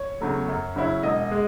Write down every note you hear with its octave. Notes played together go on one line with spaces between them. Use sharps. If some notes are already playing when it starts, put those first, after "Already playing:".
Already playing: C#5
E2 C#3 F#3 A3
F#2
C#3 F#3 C#4 E4
E1 D#5
G#3